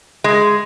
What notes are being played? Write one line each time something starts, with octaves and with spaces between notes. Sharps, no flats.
G#3